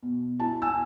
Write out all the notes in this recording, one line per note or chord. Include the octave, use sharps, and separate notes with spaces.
B2
E4 A5
G#5 E6